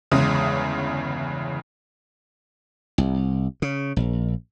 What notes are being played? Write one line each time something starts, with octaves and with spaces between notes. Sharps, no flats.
G1 E2 C#3 G#3 D#6
C2
C#3
A#1